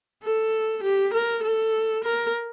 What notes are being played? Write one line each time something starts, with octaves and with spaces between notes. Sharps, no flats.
A4
G4
A#4
A4
A#4